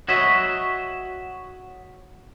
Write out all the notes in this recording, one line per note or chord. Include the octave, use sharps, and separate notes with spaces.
F#4 C#5 D#5 E5